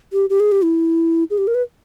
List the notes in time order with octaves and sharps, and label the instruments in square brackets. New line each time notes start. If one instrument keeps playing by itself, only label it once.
[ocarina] G4
G4
G#4
G4
E4
G#4
G4
A#4
B4